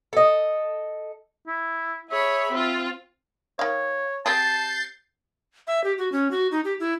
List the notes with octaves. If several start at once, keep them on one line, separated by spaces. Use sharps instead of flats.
A4 D#5
E4
G#4 C#5 E5 B5
C4 F4
D#3 C#5 F5
C4 G4 G#4 A5 G6 A6 C7
E5
G4
F#4
C#4
F#4
D#4
G4
E4